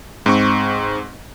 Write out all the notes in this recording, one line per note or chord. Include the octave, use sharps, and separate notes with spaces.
G#2 C4 C#6